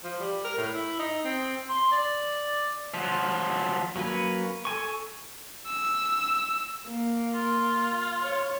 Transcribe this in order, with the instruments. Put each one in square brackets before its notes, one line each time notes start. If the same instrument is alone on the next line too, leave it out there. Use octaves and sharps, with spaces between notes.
[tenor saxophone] F3
G3
A#4
A2
E4
D#4
C4
[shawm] C6
D5
[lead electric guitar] F3 F#3
[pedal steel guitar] F#3 A#3 C#4 B4
A4 G#5 C#6
[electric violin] E6
A#3
[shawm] F4
[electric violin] C#5